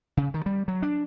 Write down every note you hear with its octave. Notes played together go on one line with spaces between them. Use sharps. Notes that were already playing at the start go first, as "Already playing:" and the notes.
C#3
D#3
G3
F#3
D4